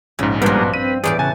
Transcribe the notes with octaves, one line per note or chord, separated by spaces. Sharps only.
A#1 G#2 C#3
G2 F3 G3 G#3 A#3 B3 D4 F#4
C4 B4 D#7
E2 A2 G4 G#4 D5
C#3 F#4 G#5 A5